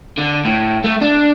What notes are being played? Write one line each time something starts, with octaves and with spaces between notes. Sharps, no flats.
D3
A2
A3
D4